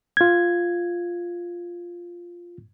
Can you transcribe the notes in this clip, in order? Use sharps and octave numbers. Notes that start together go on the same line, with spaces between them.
F4 G#6